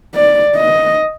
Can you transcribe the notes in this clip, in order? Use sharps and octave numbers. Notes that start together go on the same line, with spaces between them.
D5
D#5